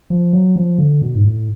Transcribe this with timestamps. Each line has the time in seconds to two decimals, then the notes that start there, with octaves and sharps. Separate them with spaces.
0.10 F3
0.33 F#3
0.56 F3
0.79 D3
1.02 B2
1.15 G#2
1.25 A2